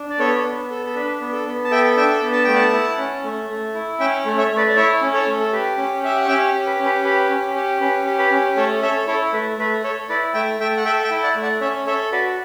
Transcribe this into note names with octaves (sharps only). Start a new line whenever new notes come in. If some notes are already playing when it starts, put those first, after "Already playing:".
Already playing: D4
D5
B3 A4 C#5
B3
A4
A4
D4 B4
B3
A4
B3
A5
A4 E5 G5
D4 E5 G5
B3
A5
A3 G5
F#5 A5
E4
C#4
A3
A3
E4
C#4 E5 G5
A3
C#5 E5
A3
B4 D5
D5
E4 C#5 E5
C#4
A4 C#5
A3
A4
G4 B4
C#4
G4 E5
F#5
C#4 E5 G5
G4
B4
C#4
B4
G4 B4
C#4
G4
C#4 B4
G4
B4
C#4
A3 A4 C#5
A4 C#5 E5
E4 A4 C#5
A3 B4
A3 B4
A4 C#5
E4 B4 D5
A3 E5 G5
A3 E5 G5
F#5
A4 E5 G5
E5 G5
E4
D5 F#5
A3
D5 F#5
C#4 C#5 E5
A4 C#5 E5
F#4 B4 D5